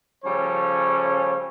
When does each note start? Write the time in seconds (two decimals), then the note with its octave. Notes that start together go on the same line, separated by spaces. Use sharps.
0.24 C#3 F3 G3 A3 C#4 C#5